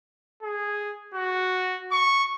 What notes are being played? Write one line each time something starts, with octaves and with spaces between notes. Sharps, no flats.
G#4
F#4
C#6